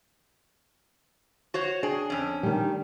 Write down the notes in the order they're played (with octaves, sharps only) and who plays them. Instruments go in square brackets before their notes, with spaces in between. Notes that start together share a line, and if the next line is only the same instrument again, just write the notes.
[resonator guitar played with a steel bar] F#4 C5 C#5
[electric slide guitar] D4 G5 [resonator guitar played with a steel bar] G#4
[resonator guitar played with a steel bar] F2 C#4
[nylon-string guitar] D#3 G3